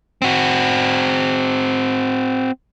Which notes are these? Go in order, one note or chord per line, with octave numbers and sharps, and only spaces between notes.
C4 F#4